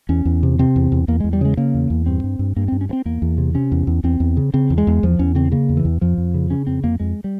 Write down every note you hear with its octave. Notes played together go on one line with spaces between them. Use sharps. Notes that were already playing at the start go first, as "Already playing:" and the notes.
E2 C#4
E2
C3
C3 C4
E2
E2
E2 A#3
E2 G#3
G3
C#3 G#3
C#3 A#3
E2
E2
G2 C4
G2
G2
G2 A#3
G2 C4
C#4
G2
C4
E2 A#3
E2
C3
C3 C#4
E2
E2
E2 C4
E2
C#3
C#3 C4
E2
G#3
E2
E2 F3
E2 C#4
C#3 C4
C#3 A#3
E2
E3
E2
F2 F3
F2
C#3
C#3 C#4
F2 C4
F2 A#3
F2 G#3
G3